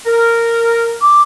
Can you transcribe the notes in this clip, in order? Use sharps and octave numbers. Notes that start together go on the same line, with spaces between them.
A#4
D6